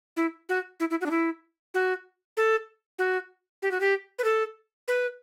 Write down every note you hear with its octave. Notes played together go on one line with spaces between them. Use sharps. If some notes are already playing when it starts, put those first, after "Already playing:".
E4
F#4
E4
E4
F#4
D4
E4
F#4
A4
F#4
G4
F#4
G4
B4
A4
B4